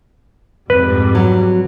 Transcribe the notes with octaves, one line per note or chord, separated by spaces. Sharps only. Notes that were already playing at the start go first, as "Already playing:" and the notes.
F2 G#2 G3 B4
F#3